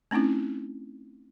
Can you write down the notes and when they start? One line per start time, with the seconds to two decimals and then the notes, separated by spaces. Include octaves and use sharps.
0.11 A3 C4 C#4 D#4 E4